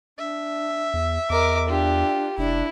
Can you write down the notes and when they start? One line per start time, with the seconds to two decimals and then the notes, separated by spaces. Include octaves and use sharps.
0.18 D4 E5
0.94 E2
1.30 E2 A#4 D#5 D6
1.69 D4 F4 G4
2.38 F1 D4 E4